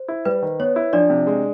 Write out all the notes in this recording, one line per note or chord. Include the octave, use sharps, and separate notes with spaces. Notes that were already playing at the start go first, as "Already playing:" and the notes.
Already playing: C5
E4
G3 B4
D#3
B3 C#5
E4
F3 D4 D5
C3
G#3